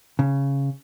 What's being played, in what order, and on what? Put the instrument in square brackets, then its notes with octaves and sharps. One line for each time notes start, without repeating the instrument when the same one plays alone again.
[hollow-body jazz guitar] C#3